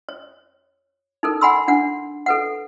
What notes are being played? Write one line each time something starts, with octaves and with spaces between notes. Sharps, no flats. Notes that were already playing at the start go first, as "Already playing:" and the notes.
C#5
D#4 A4 A#4
F#5 G#5 B5 C6 E6
D4 F#5
A4 B4 F#5